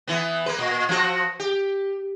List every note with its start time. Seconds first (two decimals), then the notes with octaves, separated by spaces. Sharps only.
0.07 E3 B3
0.46 A#3 B4
0.59 A#2
0.89 F3 C4 F#4
1.40 G4